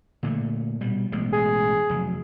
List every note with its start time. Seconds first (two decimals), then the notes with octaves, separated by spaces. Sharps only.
0.23 A#2 D3 A3
0.81 B2 G3
1.12 A1 B2 G#3
1.33 G#4
1.90 F1 F#3